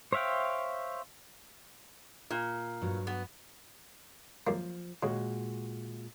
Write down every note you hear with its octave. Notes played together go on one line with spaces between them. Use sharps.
C5 C#5 E5 F5 G5
A#2
G2 F#3
B3
F#2 F3 A#3
A#2 C#3 G#3 F#4